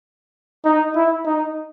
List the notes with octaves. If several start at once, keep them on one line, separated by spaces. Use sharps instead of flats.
D#4
E4
D#4